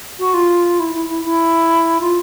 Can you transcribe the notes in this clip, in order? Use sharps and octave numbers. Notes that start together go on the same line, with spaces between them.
F#4
F4
E4
E4
E4
E4
F4